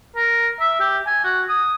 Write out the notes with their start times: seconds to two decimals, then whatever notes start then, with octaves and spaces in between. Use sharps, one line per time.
0.16 A#4
0.60 E5
0.80 G4
1.07 G#5
1.24 F#4
1.49 D#6